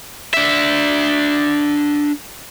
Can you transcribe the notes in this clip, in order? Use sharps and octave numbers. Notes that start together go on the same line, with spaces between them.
D4 E5